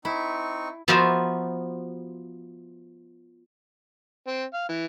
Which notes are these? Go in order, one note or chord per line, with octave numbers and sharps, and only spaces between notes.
C4 D#4 E4 C#6
F3 B3 F#4 A#4 C5 E5
C4
F5
E3